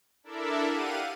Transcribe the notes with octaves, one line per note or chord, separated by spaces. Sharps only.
D4 E4 A4 A#4 D5 E5
G4 F5 F#5 D#7